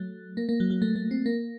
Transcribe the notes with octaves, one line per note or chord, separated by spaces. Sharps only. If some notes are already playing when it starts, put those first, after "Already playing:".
Already playing: F#3 A3
A#3
A#3
F#3
F#3
A3
A3
C4
A#3